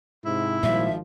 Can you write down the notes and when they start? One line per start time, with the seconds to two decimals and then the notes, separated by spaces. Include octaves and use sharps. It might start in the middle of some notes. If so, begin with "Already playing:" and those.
0.24 G#2 C3 E4
0.63 G#1 A#2 F3 G3 E5